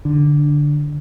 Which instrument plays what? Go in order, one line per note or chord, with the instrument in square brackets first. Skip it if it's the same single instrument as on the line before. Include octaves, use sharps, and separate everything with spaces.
[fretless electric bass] D3